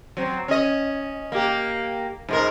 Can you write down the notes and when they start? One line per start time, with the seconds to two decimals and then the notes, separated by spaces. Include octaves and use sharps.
0.17 F#3 C4
0.48 C#4 D#5
1.32 A#3 G4
2.29 G#2 G#3 A#4